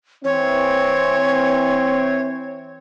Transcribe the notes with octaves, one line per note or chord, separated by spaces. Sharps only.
E3 C4 C#5